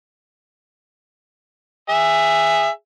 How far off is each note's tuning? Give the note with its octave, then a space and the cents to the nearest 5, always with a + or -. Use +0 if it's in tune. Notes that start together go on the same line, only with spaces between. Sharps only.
G#4 -15 E5 +10